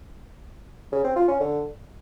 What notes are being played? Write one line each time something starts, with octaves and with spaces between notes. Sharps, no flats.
C#3
C4
F4
C#4
D3